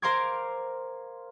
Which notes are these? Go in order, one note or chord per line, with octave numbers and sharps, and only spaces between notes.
A#4 C5 F5 C6 D6 G#6